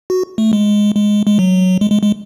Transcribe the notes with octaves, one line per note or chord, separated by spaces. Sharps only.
F#4
A3
G#3
G#3
G#3
F#3
G#3
G#3
G#3